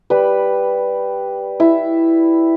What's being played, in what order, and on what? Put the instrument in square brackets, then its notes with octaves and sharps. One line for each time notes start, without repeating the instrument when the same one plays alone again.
[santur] G3 B4
E4